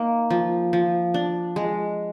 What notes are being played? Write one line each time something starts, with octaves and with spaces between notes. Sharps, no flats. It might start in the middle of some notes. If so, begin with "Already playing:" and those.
Already playing: A#3 D#4
F3
F3
D4
G#3